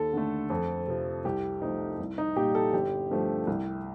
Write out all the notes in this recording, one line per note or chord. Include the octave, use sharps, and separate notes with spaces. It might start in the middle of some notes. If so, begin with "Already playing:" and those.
Already playing: D#2 A4
D3 A3
F2
C3 F3
C2 G4
C3 F3 A3 D#4
C2
D#4
A#2 G3 G4
A4
G1 G4
G2 F3 A3
C2